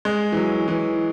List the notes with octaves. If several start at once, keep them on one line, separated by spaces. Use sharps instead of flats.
G#3
E3
F#3
E3